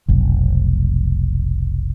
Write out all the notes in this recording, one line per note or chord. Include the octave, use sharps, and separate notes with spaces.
F1 B1